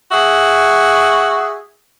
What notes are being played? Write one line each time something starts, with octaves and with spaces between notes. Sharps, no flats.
F#4 G#4 E5